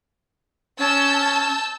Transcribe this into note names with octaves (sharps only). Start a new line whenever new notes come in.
C#4 A5 E6 G6